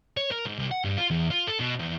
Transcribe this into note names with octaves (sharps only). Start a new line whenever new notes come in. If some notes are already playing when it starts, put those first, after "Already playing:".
C#5
A#4
G#2
C2
F#5
G2
F4
E2
F4
A4
B2
E2